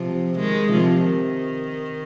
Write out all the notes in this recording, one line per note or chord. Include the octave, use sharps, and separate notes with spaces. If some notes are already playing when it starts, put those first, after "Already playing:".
Already playing: C3 F3
D#3 G#3
C3 F3
D#3